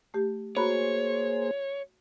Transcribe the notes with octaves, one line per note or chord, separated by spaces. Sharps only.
A3 G4
A#3 F#4 G#4 C5 C#5 A#5 B5